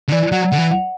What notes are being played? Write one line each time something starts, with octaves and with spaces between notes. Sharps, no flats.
D3
E3 D5
F#3 F#5
D3 F#5
E3
F#5